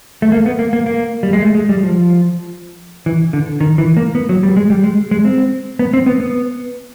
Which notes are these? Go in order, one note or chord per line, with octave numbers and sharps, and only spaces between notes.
A3
A#3
B3
A#3
A#3
A#3
G3
G#3
A3
G#3
G3
F3
E3
D3
D#3
E3
A#3
B3
F#3
G3
G#3
G3
G#3
G#3
C4
B3
C4
B3
B3